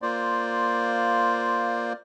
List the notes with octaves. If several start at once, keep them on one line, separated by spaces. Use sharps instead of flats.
A#3 F4 C5 D5